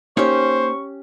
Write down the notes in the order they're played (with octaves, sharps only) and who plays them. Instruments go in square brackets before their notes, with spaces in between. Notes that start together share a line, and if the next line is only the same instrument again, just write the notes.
[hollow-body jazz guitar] A#3 D#4 C#5 [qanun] C#4 G4 [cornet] C5 [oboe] C#6